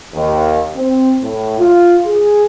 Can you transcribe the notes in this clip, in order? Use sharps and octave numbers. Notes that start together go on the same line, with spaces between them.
D#2
C4
A2
F4
G#4